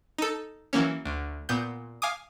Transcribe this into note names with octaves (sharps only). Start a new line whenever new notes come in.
D#4 A4
E3 F#3 A#3 C#4
D2
A#2 B3 G6
F5 G#5 D6 D#6